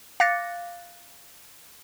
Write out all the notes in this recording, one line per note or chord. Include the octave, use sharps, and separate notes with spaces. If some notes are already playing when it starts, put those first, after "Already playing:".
F5 D6 F#6 A6 A#6 C#7